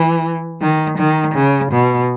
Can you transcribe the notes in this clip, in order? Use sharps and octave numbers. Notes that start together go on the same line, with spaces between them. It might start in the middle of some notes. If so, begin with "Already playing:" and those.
Already playing: E3
D#3
D#3
C#3
B2